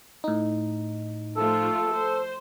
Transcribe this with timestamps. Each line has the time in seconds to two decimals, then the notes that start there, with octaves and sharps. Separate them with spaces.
0.24 A2 D#4
1.37 F3 A3 F4 A4
1.94 C5